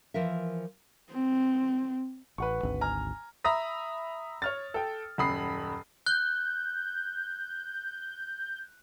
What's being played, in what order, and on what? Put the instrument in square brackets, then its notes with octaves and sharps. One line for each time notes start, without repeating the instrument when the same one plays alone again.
[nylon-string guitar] E3 F3 A#4 E5
[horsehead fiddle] C4
[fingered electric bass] A1 [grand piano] B4 F#5 C#6
[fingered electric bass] G#1 D2
[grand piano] G#5 A#5 F6
[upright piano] E5 A#5 B5 D#6 A#6
C#5 F6 A6
A4 G5
D#1 F#2 B5 D#6 C7
[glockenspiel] F#6 [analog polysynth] G6